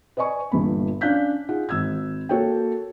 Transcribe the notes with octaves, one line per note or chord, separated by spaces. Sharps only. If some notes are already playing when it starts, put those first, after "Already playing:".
B4 D5 D#5 G#5 C#6
G1 G2 A#2 B5
C#4 D4 F5 F#6 G6 B6
D#4 F4 G#4 F#5
G#1 E6 G#6
A#3 F#4 A4 C#5 G5